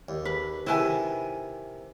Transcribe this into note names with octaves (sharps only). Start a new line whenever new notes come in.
D#2
B4
C3 D#3 E4 B4 G#5